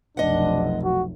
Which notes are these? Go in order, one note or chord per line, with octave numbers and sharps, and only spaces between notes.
F1 B1 D4 D#5 F#5
F#4